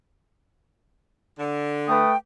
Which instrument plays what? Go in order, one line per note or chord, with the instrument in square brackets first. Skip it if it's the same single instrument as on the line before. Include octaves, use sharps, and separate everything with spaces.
[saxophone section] D3
[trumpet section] A3 B4 D#6 [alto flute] G5